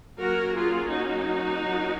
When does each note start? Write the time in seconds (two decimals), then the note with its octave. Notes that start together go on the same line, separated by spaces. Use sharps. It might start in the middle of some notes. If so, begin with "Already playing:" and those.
0.19 F#3 A#3 C#4 F#4 A#4
0.56 F4 G#4
0.92 D#4 F#4
1.65 F#3 A#3 C#4